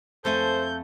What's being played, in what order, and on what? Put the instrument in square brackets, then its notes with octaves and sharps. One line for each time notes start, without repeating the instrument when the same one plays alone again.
[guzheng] F2 A3 G#5 [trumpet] A4 [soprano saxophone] C5 [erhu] G6